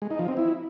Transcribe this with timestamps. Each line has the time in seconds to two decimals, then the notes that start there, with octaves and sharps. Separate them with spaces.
0.02 G#3
0.11 D#4
0.19 F3
0.28 C4
0.37 E4